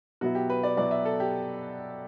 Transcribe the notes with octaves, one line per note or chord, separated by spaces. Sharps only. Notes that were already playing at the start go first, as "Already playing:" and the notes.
B2 F#3 B3 E4 F#4
G4
B4
D5
B2 F#3 B3 E4 D5
E5
A4
G4